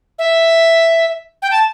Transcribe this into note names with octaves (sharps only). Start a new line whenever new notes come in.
E5
G5
A5